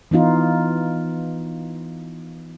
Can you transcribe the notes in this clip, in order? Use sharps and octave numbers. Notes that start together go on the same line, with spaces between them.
E3 B3 D#4 F4